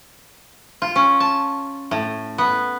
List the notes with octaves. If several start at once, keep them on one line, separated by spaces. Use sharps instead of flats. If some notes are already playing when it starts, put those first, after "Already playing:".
F4
C#4
A5
A2
B3